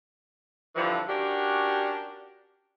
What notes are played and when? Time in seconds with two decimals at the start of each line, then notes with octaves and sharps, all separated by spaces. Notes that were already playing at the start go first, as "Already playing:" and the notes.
0.76 G2 D3 E3 F3
1.09 C#4 D4 F#4 G4 A#4